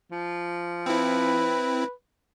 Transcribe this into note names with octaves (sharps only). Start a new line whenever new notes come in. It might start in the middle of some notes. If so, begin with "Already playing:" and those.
F3
C4 E4 B4